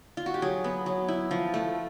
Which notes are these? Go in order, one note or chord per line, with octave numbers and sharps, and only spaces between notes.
F4
F#4
G4
F#3 G#4
B3
F#3
E4
F3
A3